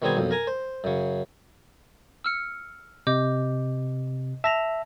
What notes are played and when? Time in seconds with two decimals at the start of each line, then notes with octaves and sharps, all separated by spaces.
0.02 B2 D#3 G3 C4 G#4 G#5
0.17 B1 F2
0.31 A#4 G#5 A#5
0.47 C5
0.84 F#2 C#3
2.24 E6 F6 C#7
3.07 C3 D#5 D6 G6
4.44 E5 A5 A#6 F7